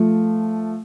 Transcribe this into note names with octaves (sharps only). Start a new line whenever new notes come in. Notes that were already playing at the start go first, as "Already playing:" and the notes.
Already playing: F3 A3